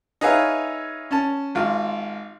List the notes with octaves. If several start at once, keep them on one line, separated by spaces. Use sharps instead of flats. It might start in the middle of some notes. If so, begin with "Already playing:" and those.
D#4 G#4 B4 C#5 E5 F5
C#4 A5
G#1 F4